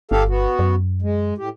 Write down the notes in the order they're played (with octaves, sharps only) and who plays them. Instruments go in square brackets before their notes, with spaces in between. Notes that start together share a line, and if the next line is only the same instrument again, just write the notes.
[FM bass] G1 [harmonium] G4 A4 F5
[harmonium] B3 F#4
[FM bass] F#2
[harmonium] G#3
A2 G4